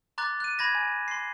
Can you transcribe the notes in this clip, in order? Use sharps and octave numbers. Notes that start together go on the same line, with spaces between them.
A#5 C6 D6 F#6 A6
F#6 D#7
B5 G#6 A#6 E7
G#5
C6 C7